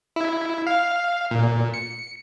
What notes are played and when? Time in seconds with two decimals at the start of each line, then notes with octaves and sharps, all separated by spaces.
0.16 E4
0.67 F5
1.31 A#2
1.74 C#7